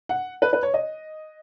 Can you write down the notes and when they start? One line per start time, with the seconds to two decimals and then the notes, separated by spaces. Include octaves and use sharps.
0.09 F#5
0.42 B4
0.53 B4
0.63 C#5
0.74 D#5